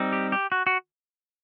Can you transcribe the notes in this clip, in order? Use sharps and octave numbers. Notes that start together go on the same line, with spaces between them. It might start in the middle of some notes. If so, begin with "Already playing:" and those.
Already playing: G3 C4 D#4
G4
G4
F#4
F#4